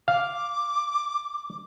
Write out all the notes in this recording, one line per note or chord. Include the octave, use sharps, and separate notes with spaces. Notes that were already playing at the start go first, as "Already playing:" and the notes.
F5 D6